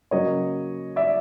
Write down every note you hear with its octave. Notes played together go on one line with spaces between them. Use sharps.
C#3 F#3 A#3 C#5 D#5
D5 E5